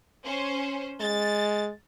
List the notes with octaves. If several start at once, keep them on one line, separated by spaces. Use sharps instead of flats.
C#4 C5
G#3 A6